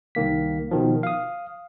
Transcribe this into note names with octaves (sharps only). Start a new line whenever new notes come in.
C2 D#3 A#3 B6
B2 D#3 F3
F5 D#6